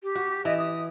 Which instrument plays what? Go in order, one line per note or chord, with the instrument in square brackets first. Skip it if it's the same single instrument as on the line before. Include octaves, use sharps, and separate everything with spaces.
[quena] G4
[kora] F#4
[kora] E3 [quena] D#5
[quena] D#6